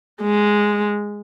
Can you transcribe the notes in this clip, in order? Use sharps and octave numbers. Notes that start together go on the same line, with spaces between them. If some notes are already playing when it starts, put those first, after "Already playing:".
G#3